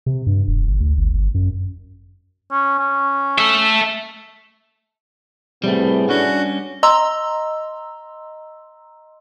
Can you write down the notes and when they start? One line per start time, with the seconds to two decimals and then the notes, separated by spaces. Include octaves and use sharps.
0.06 C3
0.27 G2
0.47 E1
0.67 G1
0.80 D2
0.97 G1
1.14 G1
1.34 F#2
2.52 C#4
2.79 C#4
3.39 A4 E5
5.64 A2 C3 G3 A3 B3 G#4
6.09 G3 C#4 D4 F#4
6.83 D#5 A#5 C6 E6